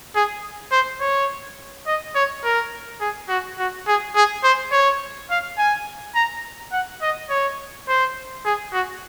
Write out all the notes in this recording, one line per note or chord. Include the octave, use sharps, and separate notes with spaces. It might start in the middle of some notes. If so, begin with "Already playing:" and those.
G#4
C5
C#5
D#5
C#5
A#4
G#4
F#4
F#4
G#4
G#4
C5
C#5
F5
G#5
A#5
F#5
D#5
C#5
C5
G#4
F#4